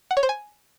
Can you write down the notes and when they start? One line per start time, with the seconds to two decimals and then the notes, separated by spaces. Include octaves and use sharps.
0.11 F#5
0.17 C#5
0.23 C5
0.29 G#5